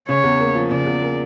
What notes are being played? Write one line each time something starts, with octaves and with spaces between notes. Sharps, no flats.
C#3 C#5
E2
A#3
F3
C#3 D5
E2
A#3